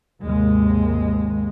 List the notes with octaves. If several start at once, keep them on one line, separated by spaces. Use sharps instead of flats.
G#1 D#2 C3 G#3